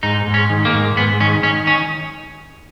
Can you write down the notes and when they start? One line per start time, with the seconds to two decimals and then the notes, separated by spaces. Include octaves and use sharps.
0.03 G#2 D#4
0.27 G#2
0.34 C#4
0.50 D#3
0.65 A#3
0.74 G#2
0.97 G#2 B3
1.20 D#3 C#4
1.43 D#3 C#4
1.67 C#4